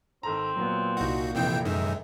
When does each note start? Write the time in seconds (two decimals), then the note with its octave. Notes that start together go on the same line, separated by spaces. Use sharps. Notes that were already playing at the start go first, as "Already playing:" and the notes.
0.23 G#1 C4 A4 A#5
0.56 A#2 F#3 B3
0.97 C2 D#4 F#4
1.35 F1 A#1 C3 E3 G5
1.65 F#2 D#3 G#3 E5